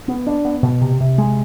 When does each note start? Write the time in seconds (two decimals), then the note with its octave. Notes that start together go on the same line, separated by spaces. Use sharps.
0.08 B3
0.27 D4
0.45 B3
0.63 B2
0.81 C3
1.00 C3
1.18 G#3